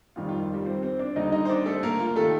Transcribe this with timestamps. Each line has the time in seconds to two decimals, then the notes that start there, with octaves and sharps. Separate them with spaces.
0.16 F2 D#3 G3 F4
0.29 F4
0.41 F4
0.54 G3 G4
0.66 C4 C5
0.82 C4 C5
0.99 D4 D5
1.16 D#2 D3 G3 D#4 D#5
1.32 D#4 D#5
1.45 C5
1.49 D4 D5
1.66 A3 A4
1.83 A#3 A#4
2.00 F4
2.16 D#3 A3 A4